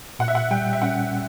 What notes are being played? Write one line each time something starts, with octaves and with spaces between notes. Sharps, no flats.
A#2 F#5
E5
F#5
G3 G5
E5
C#4 F#5